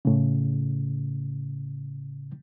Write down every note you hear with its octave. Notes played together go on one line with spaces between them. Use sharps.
A2 C#3